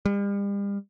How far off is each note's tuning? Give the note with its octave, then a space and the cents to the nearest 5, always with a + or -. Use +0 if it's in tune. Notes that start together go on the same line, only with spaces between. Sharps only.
G3 +40